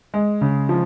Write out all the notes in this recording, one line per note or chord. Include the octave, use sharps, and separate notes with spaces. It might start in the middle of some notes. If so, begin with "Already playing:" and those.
G#3
C#3
F3